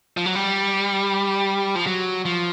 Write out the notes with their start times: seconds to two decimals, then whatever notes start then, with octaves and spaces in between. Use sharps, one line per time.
0.17 F3
0.26 F#3
0.35 G3
1.75 F3
1.87 F#3
2.25 F3